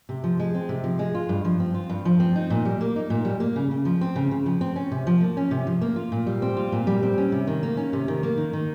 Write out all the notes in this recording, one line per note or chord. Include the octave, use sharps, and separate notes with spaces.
C3
F3
G#3
C4
C3
F3
G#3
F4
G2
F3
C4
F4
G2
F3
C4
D#4
A#2
G3
A#3
D#4
A#2
G3
A#3
C#3
C#3
F3
C4
C#3
C#3
F3
C4
C#4
C3
F3
A#3
C#4
C3
F3
A#3
F4
A#2
G3
C4
F4
A#2
G3
C4
C#4
C3
D#3
A#3
C#4
C3
D#3
A#3
D#3
D#3